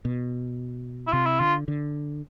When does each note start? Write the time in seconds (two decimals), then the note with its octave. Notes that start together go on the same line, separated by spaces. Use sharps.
0.05 B2
1.07 E4
1.13 C3 F4
1.26 E4
1.40 D3 F4
1.68 D3